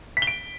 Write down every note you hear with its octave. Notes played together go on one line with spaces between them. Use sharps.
B6
G7
D7